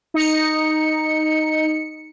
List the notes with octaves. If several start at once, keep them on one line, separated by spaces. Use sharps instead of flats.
D#4 C#7